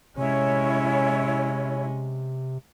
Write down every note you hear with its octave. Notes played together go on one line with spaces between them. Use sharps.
C3 G#3 C#4 E4 C#5